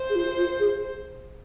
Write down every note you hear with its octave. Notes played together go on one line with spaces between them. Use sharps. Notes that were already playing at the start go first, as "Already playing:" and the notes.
Already playing: C5
G#4
F4
F4
G#4